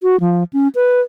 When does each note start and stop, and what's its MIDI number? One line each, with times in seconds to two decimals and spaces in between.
0.03 0.20 66
0.20 0.44 53
0.53 0.68 61
0.75 1.01 71